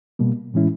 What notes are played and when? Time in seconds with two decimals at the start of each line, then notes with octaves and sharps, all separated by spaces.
0.19 B2 G3 A#3
0.54 A2 E3 G#3 C#4 E4